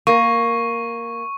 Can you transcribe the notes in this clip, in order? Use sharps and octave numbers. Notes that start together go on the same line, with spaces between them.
A#3 C#6